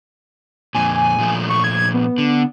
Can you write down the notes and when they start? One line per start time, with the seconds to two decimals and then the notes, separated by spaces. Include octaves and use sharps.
0.75 F2 A#2 G#5
1.18 A#2 F3 A3
1.49 C#6
1.64 G#6
1.94 B3
2.18 D3